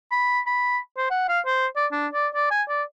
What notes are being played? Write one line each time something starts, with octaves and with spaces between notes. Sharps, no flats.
B5
B5
C5
F#5
F5
C5
D5
D4
D5
D5
G#5
D5